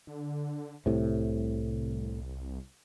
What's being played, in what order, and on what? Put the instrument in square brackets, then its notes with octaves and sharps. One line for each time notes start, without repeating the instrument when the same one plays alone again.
[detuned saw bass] D3
[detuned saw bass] C2 [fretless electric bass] A2 C3